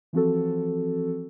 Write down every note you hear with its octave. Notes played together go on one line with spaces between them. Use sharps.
E3 F3 C4 F#4 A4